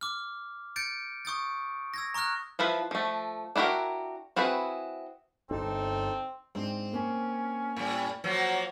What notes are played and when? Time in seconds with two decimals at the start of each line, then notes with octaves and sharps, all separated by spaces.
0.01 D6 F6
0.76 G6 A6 C#7 D7
1.25 C#6 D#6 G6 A6
1.94 E6 G#6 A#6
2.14 A#5 C#6 D#6 F6 F#6
2.59 F3 E4 F4 B4
2.91 F3 A3
3.56 D4 E4 F#4 G4 A#4
4.36 C4 E4 F#4 G#4 B4
5.51 G1 C4 D4 D#4 A4
6.55 G#2 C4 D4
6.93 A#3 C#4
7.77 A2 G3
8.24 F3 F#3 A#3